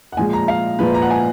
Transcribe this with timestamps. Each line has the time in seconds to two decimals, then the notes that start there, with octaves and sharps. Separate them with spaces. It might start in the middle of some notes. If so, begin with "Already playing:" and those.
0.12 F#5
0.17 A#2 F3 G#3 G#5
0.33 A#5
0.48 F5
0.79 A#2 F3 G#3 B4
0.94 A#5
1.02 F#5
1.10 G#5